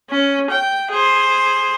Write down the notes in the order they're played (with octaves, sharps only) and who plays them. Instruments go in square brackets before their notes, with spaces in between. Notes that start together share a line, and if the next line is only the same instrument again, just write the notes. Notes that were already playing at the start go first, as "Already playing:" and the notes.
[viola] C#4
G5
G#4 C5